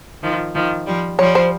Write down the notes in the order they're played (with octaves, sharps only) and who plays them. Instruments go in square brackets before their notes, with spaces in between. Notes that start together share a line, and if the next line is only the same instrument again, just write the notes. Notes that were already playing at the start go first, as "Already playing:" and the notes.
[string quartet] D#3 F3
D#3 F3
F3 G3
[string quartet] F3 G3 [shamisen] C#5
[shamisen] C5